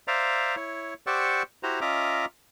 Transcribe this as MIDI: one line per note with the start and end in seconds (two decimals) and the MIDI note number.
0.08 0.56 72
0.08 0.56 74
0.08 0.56 76
0.08 0.56 77
0.08 0.56 82
0.56 0.94 64
0.56 0.94 73
1.07 1.43 67
1.07 1.43 72
1.07 1.43 74
1.07 1.43 78
1.07 1.43 85
1.07 1.43 88
1.63 1.80 64
1.63 1.80 66
1.63 1.80 67
1.63 1.80 72
1.63 1.80 82
1.81 2.25 61
1.81 2.25 65
1.81 2.25 75
1.81 2.25 76
1.81 2.25 82
1.81 2.25 86